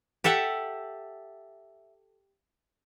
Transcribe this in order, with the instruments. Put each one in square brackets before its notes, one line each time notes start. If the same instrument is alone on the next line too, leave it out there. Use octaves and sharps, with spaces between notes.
[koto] G4 A4 E5 F#5